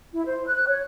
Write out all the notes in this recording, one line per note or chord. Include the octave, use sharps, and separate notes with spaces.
E4
C5
F#6
C#5